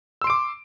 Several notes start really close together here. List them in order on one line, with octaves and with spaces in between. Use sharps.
E6 C6 D7 D6